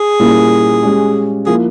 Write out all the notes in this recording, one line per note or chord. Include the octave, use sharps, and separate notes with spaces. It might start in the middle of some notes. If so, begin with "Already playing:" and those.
Already playing: G#4
A#2 G3 A#3 C#4 E4
G#3 C#4 G4
F3 A#3 E4 G#4